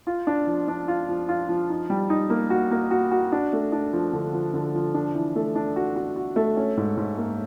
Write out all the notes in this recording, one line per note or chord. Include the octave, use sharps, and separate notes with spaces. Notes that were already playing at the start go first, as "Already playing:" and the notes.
F4
D4
F3
D4
F4
F3
F4
F3
D#4
G3
D#4
A#3
F#4
A#3
F#4
F#4
D4
A3
D4
F3
D3
F3
D3
F3
D4
E3
A3
D4
F#4
F#4
F#4
A3
C#4
G#2
G#2
A#3